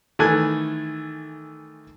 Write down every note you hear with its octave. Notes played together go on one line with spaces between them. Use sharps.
D#3 E3 A3 A4 G#5 F#6